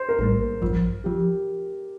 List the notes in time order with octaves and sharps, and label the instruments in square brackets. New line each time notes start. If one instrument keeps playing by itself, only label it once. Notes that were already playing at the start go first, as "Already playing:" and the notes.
Already playing: [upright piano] C5
A#4
[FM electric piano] A1 A2 G3 A#3 [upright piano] A#4
[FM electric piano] A1 G2 F3
[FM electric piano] F3 [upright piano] G4